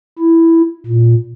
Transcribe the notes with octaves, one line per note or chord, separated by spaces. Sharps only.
E4
A#2